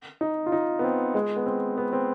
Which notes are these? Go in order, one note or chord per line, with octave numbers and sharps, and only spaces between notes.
D#4
F4
D#4
B3
C4
G#3
B3
C4
B3
C4